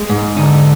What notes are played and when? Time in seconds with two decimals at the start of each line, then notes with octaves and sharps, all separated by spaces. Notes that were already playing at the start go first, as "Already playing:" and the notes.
Already playing: G#3
0.10 G#2
0.37 D3 D#4